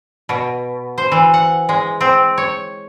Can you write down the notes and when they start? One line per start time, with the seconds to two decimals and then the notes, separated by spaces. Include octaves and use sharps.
0.29 B2
0.98 C5
1.12 E3
1.34 F#5
1.69 G#3
2.01 C4
2.38 C#5